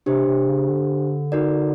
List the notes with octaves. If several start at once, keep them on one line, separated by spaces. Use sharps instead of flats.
C3 D4 G4 C5
C3
C#3
D3
D#4 F#4 A#4 D5